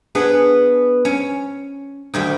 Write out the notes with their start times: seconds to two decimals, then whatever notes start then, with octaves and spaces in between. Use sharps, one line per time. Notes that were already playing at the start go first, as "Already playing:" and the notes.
0.15 B3 D4 G#4
1.05 C#4
2.14 D2 D#3 G3